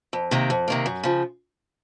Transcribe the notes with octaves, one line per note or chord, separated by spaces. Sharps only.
F2
C3 D#3 A#3
F2
C3 D#3 A#3
F#2
C#3 F3